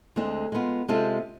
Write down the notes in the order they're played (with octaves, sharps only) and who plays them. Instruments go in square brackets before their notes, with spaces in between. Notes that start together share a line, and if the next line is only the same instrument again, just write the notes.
[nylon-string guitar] D2 D3 G#3 C4 G#4
G#3 B3 F4
C3 G#3 C4 F4 A4